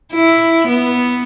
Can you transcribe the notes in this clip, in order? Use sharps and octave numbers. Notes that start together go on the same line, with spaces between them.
E4
B3